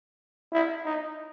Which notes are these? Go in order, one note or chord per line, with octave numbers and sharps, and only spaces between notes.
E4
D#4